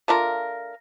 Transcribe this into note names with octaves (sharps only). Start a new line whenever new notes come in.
A3 D4 F4 A#4